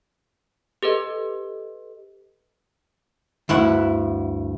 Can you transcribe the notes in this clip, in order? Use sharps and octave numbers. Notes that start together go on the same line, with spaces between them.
G4 A4 B4 D#5
D2 G2 E4 F#5